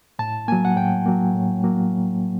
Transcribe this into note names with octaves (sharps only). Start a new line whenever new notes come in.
A2 A5
F#3 A#3 G#5
F#5
A2 G5
F#3 A#3
A2
F#3 A#3